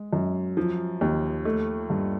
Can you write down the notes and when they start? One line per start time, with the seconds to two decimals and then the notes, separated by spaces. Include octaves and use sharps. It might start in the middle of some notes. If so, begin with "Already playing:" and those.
Already playing: G#3
0.13 F#2
0.57 F3
1.01 D#2
1.45 A3
1.90 G2